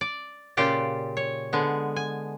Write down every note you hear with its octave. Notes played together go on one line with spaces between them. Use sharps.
D5
A#2 C#3 F4 G4 D5
C#5
D3 G#3 B3
G#5